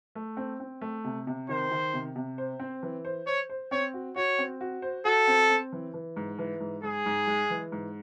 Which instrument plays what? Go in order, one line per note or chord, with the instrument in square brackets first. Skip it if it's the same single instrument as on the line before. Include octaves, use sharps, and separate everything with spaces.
[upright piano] A3
C4
C4
A3
C3
C3
[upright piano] D#3 [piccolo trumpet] C5
[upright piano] D#3
C3
C3
C5
C4
E3
C5
[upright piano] C5 [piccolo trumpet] C#5
[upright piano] C5
[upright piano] C4 [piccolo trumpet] C#5
[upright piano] F#4
[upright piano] F#4 [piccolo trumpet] C#5
[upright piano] C4
F#4
C5
[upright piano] F#4 [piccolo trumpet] A4
[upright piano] C4
C4
E3
E3
G#2
E3
G#2
[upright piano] G#2 [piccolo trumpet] G#4
[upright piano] G#2
G#3
E3
G#2